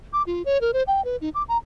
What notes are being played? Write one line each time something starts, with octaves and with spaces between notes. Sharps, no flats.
D6
F4
C#5
A#4
C5
G5
B4
D#4
D6
A#5